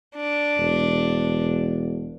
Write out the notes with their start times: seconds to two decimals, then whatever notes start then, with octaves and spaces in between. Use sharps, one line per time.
0.15 D4
0.58 E1